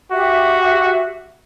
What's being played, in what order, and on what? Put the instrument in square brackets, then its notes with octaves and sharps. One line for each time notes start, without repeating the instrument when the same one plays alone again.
[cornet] F#4 [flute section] G4 E5